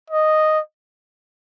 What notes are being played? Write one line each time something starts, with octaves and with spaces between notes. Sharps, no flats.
D#5